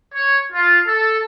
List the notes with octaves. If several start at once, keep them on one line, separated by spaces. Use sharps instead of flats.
C#5
F4
A4